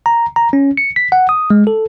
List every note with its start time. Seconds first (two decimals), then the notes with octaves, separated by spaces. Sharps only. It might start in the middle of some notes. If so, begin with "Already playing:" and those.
0.06 A#5
0.36 A#5
0.53 C#4
0.77 C#7
0.96 B6
1.12 F#5
1.29 D#6
1.50 G#3
1.67 A4